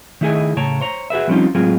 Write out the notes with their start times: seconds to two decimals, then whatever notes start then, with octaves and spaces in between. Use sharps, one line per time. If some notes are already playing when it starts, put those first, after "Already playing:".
0.21 D#3 A3 E4 G#4 D#5 G#5
0.57 A2 C#3 C#5 G5 A5 A#5
0.81 C5 C#5 A#5
1.10 F#4 G#4 B4 E5
1.28 F3 G3 C4 C#4 D#4 F4
1.55 A2 F#3 G#3 C4 F4 G#4